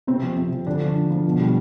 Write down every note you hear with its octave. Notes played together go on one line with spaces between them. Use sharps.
C3 C4
F3
C3
F3
D3 D4
F3
D3
F3
B2
G3